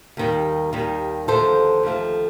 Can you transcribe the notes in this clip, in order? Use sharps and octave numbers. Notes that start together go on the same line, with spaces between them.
D#2 D#3 G3
D#2 D#3 G3
D#2 D3 F3 A3 A4 C5
D#2 D3 F3 A3